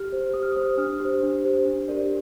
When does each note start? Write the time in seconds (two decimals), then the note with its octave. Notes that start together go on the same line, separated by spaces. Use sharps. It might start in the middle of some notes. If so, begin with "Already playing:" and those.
Already playing: G4 F6
0.12 C5
0.34 G4 D#6
0.43 F6
0.52 C5 D#6
0.77 D4 F6
1.00 G4 C5
1.23 D4
1.45 G4 C5
1.65 D4
1.88 G4 A#4 D5